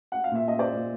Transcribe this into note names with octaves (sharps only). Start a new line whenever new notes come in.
F#5
F5
A#2 E5
D#5
C5 D5
A#2